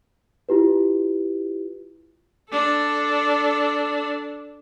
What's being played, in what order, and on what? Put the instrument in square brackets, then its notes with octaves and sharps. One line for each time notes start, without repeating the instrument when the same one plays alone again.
[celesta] E4 F4 G4 B4
[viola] D4 A4